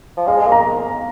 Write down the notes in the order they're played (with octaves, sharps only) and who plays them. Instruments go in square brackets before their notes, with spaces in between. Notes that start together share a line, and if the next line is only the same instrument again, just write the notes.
[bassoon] F3
[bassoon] G#3 [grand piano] F5
[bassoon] G#3
A#3
[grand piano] A#5